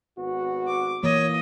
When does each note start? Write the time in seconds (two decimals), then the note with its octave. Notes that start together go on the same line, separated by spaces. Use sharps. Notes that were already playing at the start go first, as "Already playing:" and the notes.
0.18 G#1 B3 F#4
0.68 D6
1.03 E3 A#3 C#5 D#5